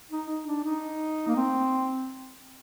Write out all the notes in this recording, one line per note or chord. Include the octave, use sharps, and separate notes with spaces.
D#4
D#4
D4
D#4
A#3
C4